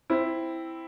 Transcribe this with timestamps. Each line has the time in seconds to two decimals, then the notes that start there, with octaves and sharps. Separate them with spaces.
0.10 C4 E4